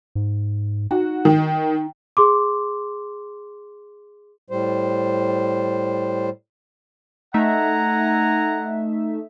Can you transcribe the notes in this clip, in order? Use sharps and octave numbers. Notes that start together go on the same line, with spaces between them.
G#2
D#4 F#4
D#3
G#4 C6 D6
A2 G3 C5
A3 D#4 E5 F#5 G#5 A#5